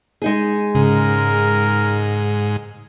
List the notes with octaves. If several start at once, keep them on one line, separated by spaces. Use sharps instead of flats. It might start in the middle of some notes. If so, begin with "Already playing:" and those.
G#3 D#4 G#4
G#2 C#3 A#4